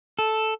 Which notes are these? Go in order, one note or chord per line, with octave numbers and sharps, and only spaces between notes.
A4